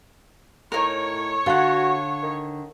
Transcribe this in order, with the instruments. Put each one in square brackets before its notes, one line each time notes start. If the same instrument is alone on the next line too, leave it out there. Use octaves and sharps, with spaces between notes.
[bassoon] A2 [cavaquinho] D#4 A#4 [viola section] C#5
[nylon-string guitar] D3 [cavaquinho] F4 F#5 [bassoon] F#4
[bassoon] D#3